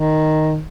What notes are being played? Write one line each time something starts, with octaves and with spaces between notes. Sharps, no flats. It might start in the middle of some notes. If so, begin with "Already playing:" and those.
Already playing: D#3